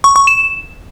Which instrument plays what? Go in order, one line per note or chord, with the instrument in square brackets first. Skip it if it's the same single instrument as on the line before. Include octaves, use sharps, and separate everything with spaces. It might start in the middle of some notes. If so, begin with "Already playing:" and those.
[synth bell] C#6
C#6
E7